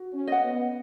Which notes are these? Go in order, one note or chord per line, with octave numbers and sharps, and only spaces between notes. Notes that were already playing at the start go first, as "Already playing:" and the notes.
Already playing: F#4
C#4
D#5 F#5
B3